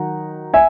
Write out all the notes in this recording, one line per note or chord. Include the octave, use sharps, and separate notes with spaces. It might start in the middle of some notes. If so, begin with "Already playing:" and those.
Already playing: D#3 F#3 D#4 F#5
E5 G#5